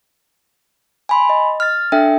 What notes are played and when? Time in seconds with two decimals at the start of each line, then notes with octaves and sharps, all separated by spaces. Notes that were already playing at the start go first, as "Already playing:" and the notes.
1.09 G#5 B5 C6
1.29 D#5
1.60 F6 A6
1.92 D4 A4 E5 G5